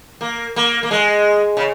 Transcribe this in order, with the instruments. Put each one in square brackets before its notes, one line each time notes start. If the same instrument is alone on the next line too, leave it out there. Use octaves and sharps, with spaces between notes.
[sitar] A#3
A#3
A#3
G#3
C#3